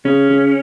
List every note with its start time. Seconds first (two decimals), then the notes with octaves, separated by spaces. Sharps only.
0.05 C#3 C#4
0.30 C#3